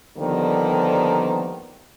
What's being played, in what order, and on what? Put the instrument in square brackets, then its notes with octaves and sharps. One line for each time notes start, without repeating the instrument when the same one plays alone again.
[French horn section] D3 D#3 F3 G3 A#3 B3